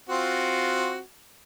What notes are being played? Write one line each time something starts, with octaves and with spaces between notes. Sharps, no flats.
C4 F4 F#4